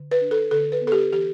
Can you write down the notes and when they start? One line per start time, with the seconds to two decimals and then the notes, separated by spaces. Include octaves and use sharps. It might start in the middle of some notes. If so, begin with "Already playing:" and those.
Already playing: D3
0.11 B4
0.21 D4
0.31 A4
0.51 D3 A4
0.72 B4
0.81 B3
0.87 A4
0.92 G4
1.12 E3 G4